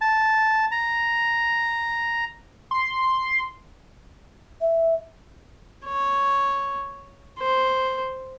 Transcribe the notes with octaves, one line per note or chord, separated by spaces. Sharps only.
A5
A#5
C6
E5
C#5
C5